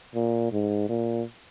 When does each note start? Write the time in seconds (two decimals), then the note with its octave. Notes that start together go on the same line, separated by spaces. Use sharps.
0.15 A#2
0.52 G#2
0.89 A#2